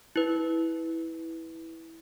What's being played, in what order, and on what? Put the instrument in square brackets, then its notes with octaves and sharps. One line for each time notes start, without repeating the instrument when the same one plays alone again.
[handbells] E4 B4